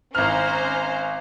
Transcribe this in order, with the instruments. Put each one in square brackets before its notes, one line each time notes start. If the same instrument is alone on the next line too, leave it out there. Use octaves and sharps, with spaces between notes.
[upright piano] G#1 F6 [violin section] C#4 C5 A#5